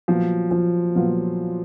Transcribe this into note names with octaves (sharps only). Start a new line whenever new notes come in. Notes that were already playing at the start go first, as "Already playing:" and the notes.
A#2 F3 F#3 B3 F4
F3
A#2 F#3 B3 F4